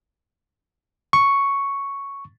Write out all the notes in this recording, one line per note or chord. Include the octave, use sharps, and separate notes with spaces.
C#6